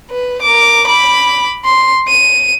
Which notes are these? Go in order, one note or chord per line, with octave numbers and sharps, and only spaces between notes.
B4
A#4 D6
B5 D6
C6
D#7